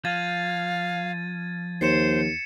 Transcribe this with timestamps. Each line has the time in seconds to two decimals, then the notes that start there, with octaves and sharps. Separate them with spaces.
0.05 F3 F5 G#6 A6 D#7
1.81 D#2 C5 C7 C#7 E7